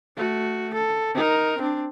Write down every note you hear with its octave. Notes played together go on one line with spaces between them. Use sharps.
A3 F#4
A4
D#4 A#4
C4 D4